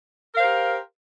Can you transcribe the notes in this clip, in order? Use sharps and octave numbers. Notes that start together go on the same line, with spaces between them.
G4 A#4 C5 F5